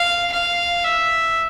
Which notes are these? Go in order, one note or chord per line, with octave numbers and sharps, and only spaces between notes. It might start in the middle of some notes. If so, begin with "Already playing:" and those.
Already playing: F5
F5
E5